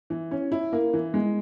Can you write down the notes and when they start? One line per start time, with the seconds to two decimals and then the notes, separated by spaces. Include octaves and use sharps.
0.10 E3
0.31 C#4
0.52 E4
0.73 A#3
0.93 E3
1.14 G#3